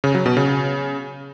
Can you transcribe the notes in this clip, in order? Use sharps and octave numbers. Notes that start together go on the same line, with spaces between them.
C#3
F#3
B2
C#3